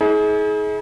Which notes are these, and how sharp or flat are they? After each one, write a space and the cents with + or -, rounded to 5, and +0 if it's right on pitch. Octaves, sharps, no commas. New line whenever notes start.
D#4 +45 G#4 +30